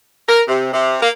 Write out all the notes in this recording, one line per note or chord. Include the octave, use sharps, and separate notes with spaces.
A#4
C3
C3
A#3